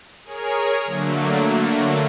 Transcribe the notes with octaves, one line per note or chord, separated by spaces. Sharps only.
G#4 A#4 C#5
D3 F#3 A3 A#3